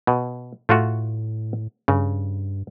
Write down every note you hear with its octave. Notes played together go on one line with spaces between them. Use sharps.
B2
A2 A3 F4 F#4
G2 C#3